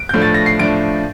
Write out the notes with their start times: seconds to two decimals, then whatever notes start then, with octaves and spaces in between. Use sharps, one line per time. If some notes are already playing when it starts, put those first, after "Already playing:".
Already playing: D7
0.09 A2 F3 A3 D4 G6
0.22 A6
0.34 A#6
0.46 C7
0.59 A2 F3 A3 D4 D7